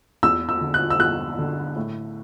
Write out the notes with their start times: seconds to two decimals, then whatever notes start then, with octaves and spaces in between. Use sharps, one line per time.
0.23 E2 E6
0.49 E6
0.61 D3
0.74 F#6
0.90 E6
1.00 E2 F#6
1.39 D3
1.76 A2